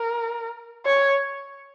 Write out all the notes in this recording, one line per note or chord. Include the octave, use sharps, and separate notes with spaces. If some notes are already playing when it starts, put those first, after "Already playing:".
Already playing: A#4
C#5